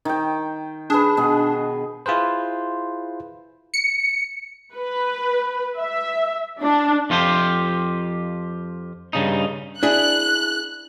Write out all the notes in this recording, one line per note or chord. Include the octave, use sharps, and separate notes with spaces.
D#3 G5
D4 G#4 B4
B2 G#4
E4 F4 G#4 B4 C5
C#7
B4
E5
D4
F2 F4 G4 C5
G2 C#3 D#4
D4 E4 G#4 F#6